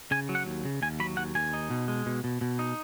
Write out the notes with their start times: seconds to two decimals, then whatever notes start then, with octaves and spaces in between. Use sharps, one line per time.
0.11 C#3 G#5
0.29 F#3
0.35 F#5
0.46 D#2
0.65 C#3
0.82 D#2 G#5
1.00 F#3 B5
1.17 D#2 F#5
1.35 D#2 G#5
1.53 D#4
1.71 B2
1.88 G#3
2.06 B2
2.24 B2
2.41 B2
2.59 D#4